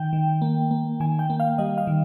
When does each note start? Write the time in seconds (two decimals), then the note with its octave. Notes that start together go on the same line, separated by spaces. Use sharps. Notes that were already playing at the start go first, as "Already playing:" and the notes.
Already playing: D#3 G5
0.13 D#3
0.42 A#3
0.71 A#3
1.00 D#3 G#5
1.19 G5
1.30 A#3
1.40 F5
1.58 G3 D#5
1.78 F5
1.87 D#3